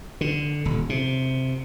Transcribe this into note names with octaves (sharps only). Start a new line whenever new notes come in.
D3
D#1
C3